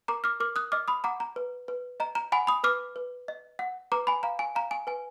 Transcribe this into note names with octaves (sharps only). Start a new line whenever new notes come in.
A#4 A#5 D6
D6 F6
A#4 D6 F6
D#6 F#6
D#5 D6 F6
B5 D#6
F#5 A#5 D6
A#5
B4
B4
D#5 A#5
A#5
F#5 G#5 B5
B5 D#6
B4 D6 F6
B4
D#5
F#5
B4 A#5 D6
G#5 B5
F5 A#5
G#5
F5 A#5
G#5
B4 G#5